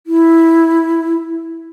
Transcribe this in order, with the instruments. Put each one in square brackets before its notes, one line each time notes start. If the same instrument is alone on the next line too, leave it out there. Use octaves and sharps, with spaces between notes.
[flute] E4